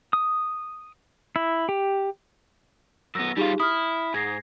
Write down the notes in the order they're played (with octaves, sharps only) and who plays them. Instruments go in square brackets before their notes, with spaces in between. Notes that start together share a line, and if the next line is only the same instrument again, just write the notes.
[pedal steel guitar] D#6
E4
G4
[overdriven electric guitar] F#2 B3 [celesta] E6 A#6
[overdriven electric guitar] G3 F4 [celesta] D#4 G4 G#4
[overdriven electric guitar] E4 [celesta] D#6 F6
[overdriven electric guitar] G#2 [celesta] G#6 A#6 C7